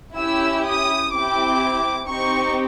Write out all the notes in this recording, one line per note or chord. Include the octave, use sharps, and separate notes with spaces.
C#4 E4 G4 E6
D#6
C4 E4 G4 D6
C4 D#4 G4 C#6